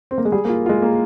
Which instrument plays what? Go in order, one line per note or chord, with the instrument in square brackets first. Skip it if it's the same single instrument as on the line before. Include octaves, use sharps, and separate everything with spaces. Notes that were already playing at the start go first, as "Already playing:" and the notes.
[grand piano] C4
A#3
G#3
[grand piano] G3 [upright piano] G#4
[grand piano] A#3
[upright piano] F4
[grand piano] G#3 [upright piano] F4
[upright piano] A#3